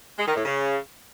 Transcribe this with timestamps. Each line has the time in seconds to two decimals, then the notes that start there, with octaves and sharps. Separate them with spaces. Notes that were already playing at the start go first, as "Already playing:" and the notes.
0.18 G#3
0.27 D#3
0.36 A2
0.45 C#3